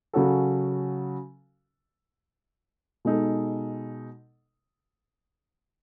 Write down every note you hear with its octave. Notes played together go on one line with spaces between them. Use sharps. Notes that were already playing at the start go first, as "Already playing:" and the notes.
C#3 F#3 C#4 F#4 A4
B2 G#3 D#4 A4